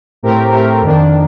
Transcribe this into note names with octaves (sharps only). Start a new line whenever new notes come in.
A2 A3 C4 G4 A#4
A2 A3 C4 G4 A#4
F2 D#3 A#3 D4
D#3